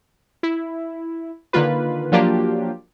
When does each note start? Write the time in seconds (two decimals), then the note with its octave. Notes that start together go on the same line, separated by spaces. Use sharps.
0.43 E4
1.53 D3 D#3 A#3 F4 B4
2.12 F3 F#3 A#3 D4 F4 G4